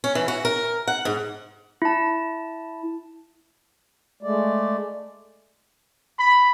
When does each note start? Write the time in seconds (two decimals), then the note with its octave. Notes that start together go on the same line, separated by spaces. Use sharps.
0.04 C#4
0.15 E3
0.28 F#4
0.45 A#4
0.87 F#5
1.05 G#2
1.82 E4 A5
4.23 G#3 A3 D5
6.18 B5